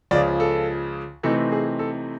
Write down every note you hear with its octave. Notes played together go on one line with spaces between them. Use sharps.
C#2 C#3 F3 D5
A4
C3 E3 A3 C4 D#4 A4
G#4
A4